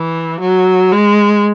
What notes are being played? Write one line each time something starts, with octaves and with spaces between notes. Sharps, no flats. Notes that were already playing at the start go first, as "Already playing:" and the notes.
Already playing: E3
F#3
G#3